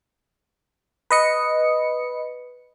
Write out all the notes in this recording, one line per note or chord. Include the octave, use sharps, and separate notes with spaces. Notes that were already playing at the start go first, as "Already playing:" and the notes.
B4 D#5 C#7